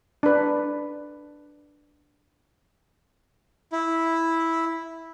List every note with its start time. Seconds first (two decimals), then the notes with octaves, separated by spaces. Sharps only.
0.23 D4 B4
3.72 E4